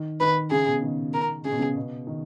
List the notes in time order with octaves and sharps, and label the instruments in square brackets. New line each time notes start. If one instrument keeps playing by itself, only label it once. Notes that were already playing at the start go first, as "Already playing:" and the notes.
Already playing: [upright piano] D#3
[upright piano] D#3 [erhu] B4
[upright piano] C#3 [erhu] G#4
[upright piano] B2
D#3
[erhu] A#4
[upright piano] C#3 [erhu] G#4
[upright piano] B2
C#3
B2
D#3